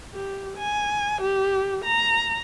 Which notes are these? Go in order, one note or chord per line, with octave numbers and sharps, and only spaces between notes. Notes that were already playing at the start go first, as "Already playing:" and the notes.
G4
G#5
G4
A#5